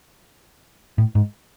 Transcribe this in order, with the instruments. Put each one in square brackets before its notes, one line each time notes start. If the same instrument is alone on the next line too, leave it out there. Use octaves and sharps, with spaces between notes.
[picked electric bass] A2
G#2